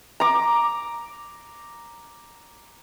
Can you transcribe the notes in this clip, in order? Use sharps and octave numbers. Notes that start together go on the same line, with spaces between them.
A#5 D6